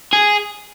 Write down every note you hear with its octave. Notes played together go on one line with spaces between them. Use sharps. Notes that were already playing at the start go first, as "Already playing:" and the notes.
G#4